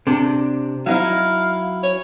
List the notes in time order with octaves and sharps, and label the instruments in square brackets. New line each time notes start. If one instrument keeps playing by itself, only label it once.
[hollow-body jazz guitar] C3 D4
[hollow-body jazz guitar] F#3 D#4 E4 [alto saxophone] F5
[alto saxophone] C#5